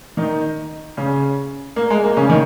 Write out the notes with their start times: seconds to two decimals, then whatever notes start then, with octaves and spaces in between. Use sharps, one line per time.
0.17 D#3 D#4
0.97 C#3 C#4
1.76 A#3
1.90 G#3
2.04 A#3
2.17 C#3 C#4
2.29 D#3 D#4